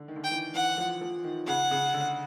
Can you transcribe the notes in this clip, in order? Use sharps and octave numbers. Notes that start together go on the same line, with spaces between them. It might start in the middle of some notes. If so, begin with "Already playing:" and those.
Already playing: D3
D#3
D3
D#3 G5
E3
E3 F#5
F3
F3
D#3
C#3 F#5
C#3
D3